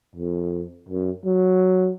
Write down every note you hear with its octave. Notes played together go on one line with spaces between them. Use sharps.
F2
F#2
F#3